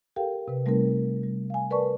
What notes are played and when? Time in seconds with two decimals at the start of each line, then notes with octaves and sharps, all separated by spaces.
0.16 G4 A4 A#4 F5 G5
0.48 C3 B4
0.66 G3 A3 C4 D#4 A#4
1.24 G3
1.50 F5 G#5
1.71 A#4 B4 D5 A5 C#6